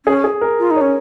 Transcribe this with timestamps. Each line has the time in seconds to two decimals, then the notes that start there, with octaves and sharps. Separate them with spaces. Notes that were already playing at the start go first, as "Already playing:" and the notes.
0.06 C#4 G#4
0.24 G#4
0.41 A#4
0.59 F4
0.71 D#4
0.76 C#5
0.81 C#4